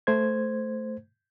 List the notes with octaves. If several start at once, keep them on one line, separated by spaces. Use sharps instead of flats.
A3 C5 G#6